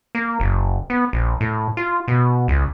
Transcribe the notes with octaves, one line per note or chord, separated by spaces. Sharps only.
A#3
F#1
B3
A#1
A2
F4
B2
C#2